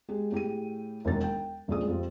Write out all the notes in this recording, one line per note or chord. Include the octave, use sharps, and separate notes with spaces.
G#3 G4 G#4
A2 G4 G#4 D#7
E1 D#2 D#3 F#3 A6
G5
D#1 G2 F3 G#3 A3 D#6
F2 F3 G3